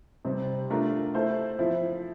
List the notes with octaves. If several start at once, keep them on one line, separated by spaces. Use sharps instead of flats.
C3 G3 C4
A3 D4 F4 A#4
A3 E4 A4 C5
F3 C4 E4